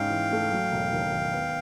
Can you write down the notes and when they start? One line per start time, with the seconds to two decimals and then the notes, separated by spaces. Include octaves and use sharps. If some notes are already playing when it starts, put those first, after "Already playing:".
Already playing: G#2 C#4 F5 G5
0.10 E3
0.31 A3
0.52 F#3
0.72 E1
0.93 D#2
1.12 D#3
1.33 B3